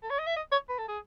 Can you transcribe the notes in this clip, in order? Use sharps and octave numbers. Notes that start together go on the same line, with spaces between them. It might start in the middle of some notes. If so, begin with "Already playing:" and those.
A4
C#5
D#5
E5
D#5
C#5
B4
A4
G#4